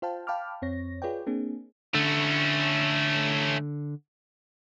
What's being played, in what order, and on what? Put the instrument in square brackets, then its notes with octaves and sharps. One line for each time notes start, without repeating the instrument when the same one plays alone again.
[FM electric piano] F4 C5 F5 G5 A5
F5 G5 A5 B5 D6 F6
F2 C4 C#5 A#6
F4 G#4 B4 C#5 D5 G5
A#3 C4 D4 G#4
[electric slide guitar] D3 [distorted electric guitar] A3 C#4